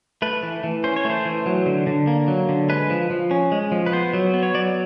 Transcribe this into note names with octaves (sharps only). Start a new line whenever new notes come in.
A3 B4
E3
E3
C#4 C5
C#5
A3 C5
E3
F#3
D3
D3
A#3
F#3
D3
G#3 B4
F3
F3
C#4
G#3
F3
B4
B3 C5
F#3
B3
C#5
F#3 D5